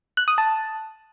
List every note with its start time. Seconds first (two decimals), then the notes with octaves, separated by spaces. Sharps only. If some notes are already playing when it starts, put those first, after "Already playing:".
0.17 F#6
0.28 D#6
0.38 A5